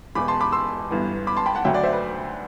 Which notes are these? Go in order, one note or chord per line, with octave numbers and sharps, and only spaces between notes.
E1 E2 B2 B5 D6
A5 C6
B5 D6
C6 E6
G1 G2 E3 B3
B5 D6
A5 C6
G5 B5
F#5 A5
D2 D3 F#3 E5 G5
D5 F#5
C5 E5
B4